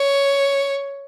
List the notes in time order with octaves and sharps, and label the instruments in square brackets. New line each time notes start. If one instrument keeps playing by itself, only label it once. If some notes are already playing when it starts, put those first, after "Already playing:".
Already playing: [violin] C#5